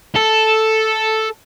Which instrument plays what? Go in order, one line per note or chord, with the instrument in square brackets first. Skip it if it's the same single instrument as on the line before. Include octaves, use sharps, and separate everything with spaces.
[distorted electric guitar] A4